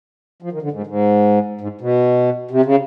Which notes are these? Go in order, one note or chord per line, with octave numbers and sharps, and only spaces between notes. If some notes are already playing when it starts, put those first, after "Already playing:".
F3
D#3
D3
G#2
G#2
G#2
B2
C3
C#3